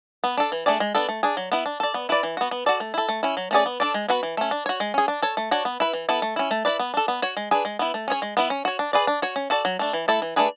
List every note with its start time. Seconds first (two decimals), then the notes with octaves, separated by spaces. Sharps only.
0.24 B3
0.37 D4 A4
0.52 E3
0.66 A3 D4 G#4 D5
0.80 G#3
0.95 B3 D4 A4
1.09 A3
1.23 D4 G#4
1.37 F#3
1.52 B3 E4
1.66 D4
1.80 A4 D5
1.94 B3
2.09 E4 B4 D5
2.23 E3
2.37 B3 F#4
2.51 B3
2.66 F#4 A4 D5
2.80 A3
2.94 E4 A4
3.09 A3
3.23 C#4 E4
3.37 F#3
3.51 A3 C#4 G#4 D5
3.66 B3
3.80 D4 A4 D5
3.94 G#3
4.08 B3 F#4 B4
4.23 E3
4.37 A3 C#4
4.51 D4
4.66 F#4 C#5
4.80 G#3
4.94 C#4 G#4
5.08 D4
5.22 A4 C#5
5.37 A3
5.51 D4 F#4 C#5
5.65 B3
5.80 E4 B4
5.93 E3
6.09 B3 E4 A4
6.22 A3
6.36 C#4 E4
6.51 A3
6.65 E4 B4 D5
6.79 B3
6.94 D4 A4
7.08 B3
7.22 F#4 C#5
7.37 G#3
7.51 D4 G#4 B4
7.65 G#3
7.79 B3 E4
7.94 A3
8.08 C#4 G#4 C#5
8.22 G#3
8.37 B3 E4
8.50 C#4
8.65 F#4 C#5
8.79 D4
8.93 G#4 B4 D5
9.07 D4
9.22 F#4 C#5
9.36 C#4
9.50 F#4 A4 D5
9.65 F#3
9.79 A3 D4
9.93 E3
10.08 A3 E4 A4
10.22 E3
10.36 A3 D4 G#4 B4